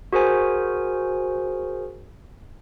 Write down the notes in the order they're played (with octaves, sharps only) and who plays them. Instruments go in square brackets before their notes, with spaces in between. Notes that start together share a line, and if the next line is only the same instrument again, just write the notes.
[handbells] F#4 G#4 A#4 C5 G#5